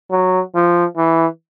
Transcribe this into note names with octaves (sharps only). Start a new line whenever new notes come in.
F#3
F3
E3